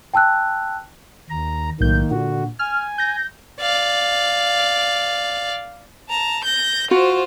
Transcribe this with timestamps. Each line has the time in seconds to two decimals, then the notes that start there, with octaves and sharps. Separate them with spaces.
0.14 G5 A5 E6 F#6
1.30 D#2 A#5
1.80 B1 A2 D#3 A#3 G6
2.11 A#2 D3 F#4
2.59 G#5 F6
2.98 G6 A#6
3.61 D5 F5
6.09 A5 A#5
6.44 G6 A#6
6.91 F4 F#4 C5